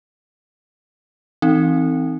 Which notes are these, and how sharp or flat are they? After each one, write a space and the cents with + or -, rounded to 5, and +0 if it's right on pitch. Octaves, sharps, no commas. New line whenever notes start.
E3 +0 C4 +0 D#4 +0